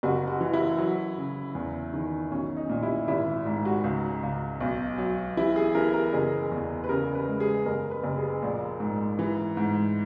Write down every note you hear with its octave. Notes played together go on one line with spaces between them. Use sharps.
F#1 F#4
F#4
E3
E4
F#3
C#3
E2
D#3
B1 C#4
D#4
A#2
E4
G#1 E4
G#2
F#4
C#2
C#2
B1
F#3
E3 E4
G#4
E3 A#4
A#4
F#1 G#4
E2
B4
C#3 A#4
B4
G#3
G#4
F#1 A#4
B4
F#1
G#4
A#1
G#2
E3
G#2